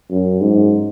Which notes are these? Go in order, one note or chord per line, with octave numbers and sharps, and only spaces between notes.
F#2
G#2